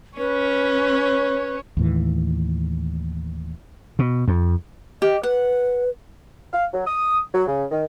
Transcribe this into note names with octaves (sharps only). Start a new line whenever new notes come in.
C#4 B4 C#5
D#2 A2 E3
B2
F2
G4 D#5
B4 F#5
F5
F#3
D#6
F#3
C#3
D#3